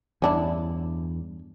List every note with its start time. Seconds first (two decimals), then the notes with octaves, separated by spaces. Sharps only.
0.22 E2 G2 C#4 D4 E4